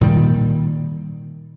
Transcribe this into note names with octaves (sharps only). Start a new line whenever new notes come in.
A#2 D#3 G3